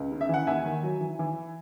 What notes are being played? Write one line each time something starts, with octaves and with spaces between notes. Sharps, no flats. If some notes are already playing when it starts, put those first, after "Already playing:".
Already playing: C#2
C#3
E5
E3 F#5
D#2 E5 G#5
D#3
F#3
E3
E3